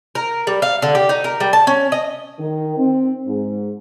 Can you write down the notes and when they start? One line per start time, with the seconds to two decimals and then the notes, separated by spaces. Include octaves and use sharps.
0.15 A#4
0.47 G3
0.62 F5
0.82 D3
0.95 G4
1.09 D#4
1.24 A#4
1.40 G3
1.53 A5
1.67 C#4
1.92 D#5
2.39 D#3
2.77 C4
3.27 G#2